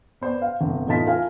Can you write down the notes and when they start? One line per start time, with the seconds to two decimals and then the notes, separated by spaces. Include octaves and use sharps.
0.21 B3 C5 D5
0.42 F5
0.61 G1 C2
0.87 E2 A2 D#4 F4 A5 B6
1.06 F4 A#4 F5 G#5